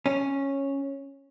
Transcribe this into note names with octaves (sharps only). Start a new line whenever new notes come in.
C#4